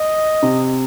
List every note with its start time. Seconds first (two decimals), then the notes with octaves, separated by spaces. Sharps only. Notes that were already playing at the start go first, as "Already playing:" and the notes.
Already playing: D#5
0.42 C3